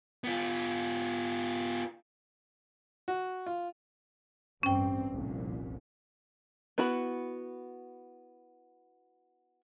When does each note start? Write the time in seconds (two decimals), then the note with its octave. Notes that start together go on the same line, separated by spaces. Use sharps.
0.24 B3 F4
3.08 F#4
3.46 F4
4.63 A1 G2 C4 C#4 G5
5.14 F1 C2 A#2
6.78 B3 E4 F#4 B5